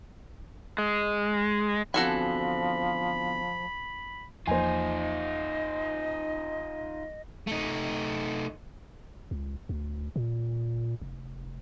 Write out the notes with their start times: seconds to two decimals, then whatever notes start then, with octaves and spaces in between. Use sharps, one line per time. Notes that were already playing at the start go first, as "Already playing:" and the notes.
0.78 G#3
1.94 E2 D3 F3 C4 F#4 A4 G#5 B5
4.47 E2 F3 A#3 D#4 F4 C5 D#5 G#5
7.47 A3 D#4
9.31 C#2
9.69 D2
10.16 A#2
11.02 F1